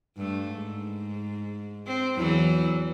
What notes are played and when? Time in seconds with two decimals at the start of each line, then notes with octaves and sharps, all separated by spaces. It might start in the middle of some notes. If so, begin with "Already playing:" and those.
0.17 G2 A3
0.53 G#2
1.87 C4
2.17 E2 E3 F#3